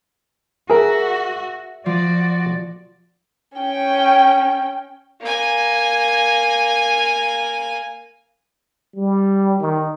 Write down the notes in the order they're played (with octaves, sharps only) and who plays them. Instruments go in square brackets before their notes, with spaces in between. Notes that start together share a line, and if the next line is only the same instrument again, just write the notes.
[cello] F#4 [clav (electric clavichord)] G#4 A#4 [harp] E5
[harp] F3 [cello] F#4 D5
[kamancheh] C#4 G5
[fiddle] A#3 G#5
[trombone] G3
D#3